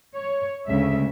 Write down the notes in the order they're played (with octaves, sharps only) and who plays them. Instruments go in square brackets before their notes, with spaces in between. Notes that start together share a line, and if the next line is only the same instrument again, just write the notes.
[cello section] C#5
D2 C#3 G#3 E5